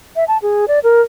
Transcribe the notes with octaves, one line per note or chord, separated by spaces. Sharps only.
E5
A5
G#4
D5
A#4